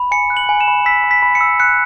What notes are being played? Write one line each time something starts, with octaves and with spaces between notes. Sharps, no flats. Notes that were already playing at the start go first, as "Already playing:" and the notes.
Already playing: B5
G#5 C#7
F#6
F#7
G#5
E7
B5
E6 B6
B5
B6
B5
C#7
E6
F#6 C#7